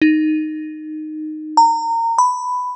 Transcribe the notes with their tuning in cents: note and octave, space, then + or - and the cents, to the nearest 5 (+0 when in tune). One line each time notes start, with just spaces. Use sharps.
D#4 -10
A#5 -25
B5 +10